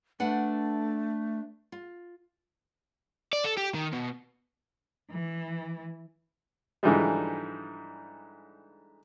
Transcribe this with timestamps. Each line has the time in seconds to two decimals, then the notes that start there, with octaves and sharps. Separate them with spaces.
0.20 A3 D4 B4 F#5
1.72 F4
3.33 D5
3.44 A4
3.57 G4
3.74 D#3
3.93 B2
5.10 E3
6.83 G#2 D3 E3 F3 G3 G#3